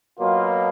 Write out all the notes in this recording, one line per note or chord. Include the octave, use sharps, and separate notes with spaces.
B2 F#3 A#3 F4